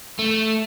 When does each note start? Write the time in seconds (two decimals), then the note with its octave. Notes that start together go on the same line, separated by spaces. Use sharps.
0.19 A3